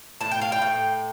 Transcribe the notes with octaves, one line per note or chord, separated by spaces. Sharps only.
A2 A5
G5
F5
G5
A2